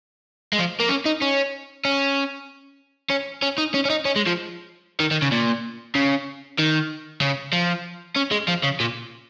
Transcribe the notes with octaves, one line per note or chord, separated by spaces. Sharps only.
G#3
F3
A#3
C#4
D#4
C#4
C#4
C#4
C#4
D#4
C#4
C#4
D#4
C#4
G#3
F3
D#3
D#3
C#3
A#2
C#3
D#3
C#3
F3
C#4
G#3
F3
C#3
A#2